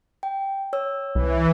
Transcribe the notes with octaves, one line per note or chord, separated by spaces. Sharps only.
G5
C#5 E6
C2 E3